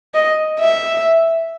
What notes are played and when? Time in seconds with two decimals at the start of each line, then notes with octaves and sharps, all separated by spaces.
0.14 D#5
0.60 E5